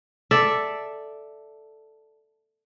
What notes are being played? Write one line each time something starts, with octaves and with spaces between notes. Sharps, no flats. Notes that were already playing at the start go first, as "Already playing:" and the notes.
A4 D5 E5